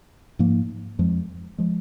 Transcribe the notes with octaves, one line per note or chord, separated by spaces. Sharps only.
G#2 F3 A#3
F2 F3 G#3
F3 G#3